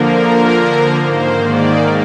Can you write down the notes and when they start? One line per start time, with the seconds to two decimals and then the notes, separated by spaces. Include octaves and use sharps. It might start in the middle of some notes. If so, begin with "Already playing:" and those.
Already playing: D3 F3 A#3 A#4
0.97 G#2 D#3 A#3 C5
1.40 D5